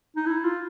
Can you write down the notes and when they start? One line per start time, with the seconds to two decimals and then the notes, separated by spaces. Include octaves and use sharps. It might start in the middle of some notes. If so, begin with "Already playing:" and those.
0.16 D#4
0.26 E4
0.44 F4